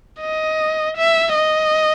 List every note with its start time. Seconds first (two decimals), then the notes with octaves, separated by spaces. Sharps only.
0.20 D#5
0.97 E5
1.35 D#5